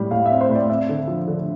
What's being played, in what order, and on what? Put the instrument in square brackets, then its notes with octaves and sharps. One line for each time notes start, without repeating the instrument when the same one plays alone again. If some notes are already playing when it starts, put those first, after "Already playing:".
Already playing: [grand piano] A2 G3
A2 F5
E5
C4
C5
A2
D5
C4 E5
D3
F3
D3